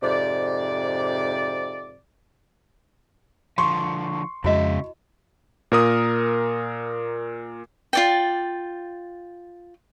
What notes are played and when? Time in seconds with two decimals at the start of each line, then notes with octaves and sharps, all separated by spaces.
0.02 F2 G#2 C3 D5
3.58 D3 F3 C6 C#6
4.44 F2 C#3 G#3 E4 F#4 D#5 E5
5.72 A#2 A#4 D#6
7.93 F4 D5 G5